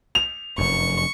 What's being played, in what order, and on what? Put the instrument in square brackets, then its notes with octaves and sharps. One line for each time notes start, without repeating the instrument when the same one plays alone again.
[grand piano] F7
[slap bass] F1 F#2 [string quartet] C#6